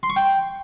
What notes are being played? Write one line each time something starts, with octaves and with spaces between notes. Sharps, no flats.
C6
C#6
G5